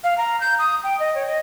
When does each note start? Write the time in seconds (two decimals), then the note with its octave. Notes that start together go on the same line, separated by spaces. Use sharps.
0.04 F5
0.18 A#5
0.41 G6
0.59 D#6
0.84 G5
1.00 D#5
1.15 C#5
1.27 D#5